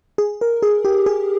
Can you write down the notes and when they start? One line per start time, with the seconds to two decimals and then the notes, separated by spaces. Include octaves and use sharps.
0.18 G#4
0.41 A#4
0.63 G#4
0.85 G4
1.06 G#4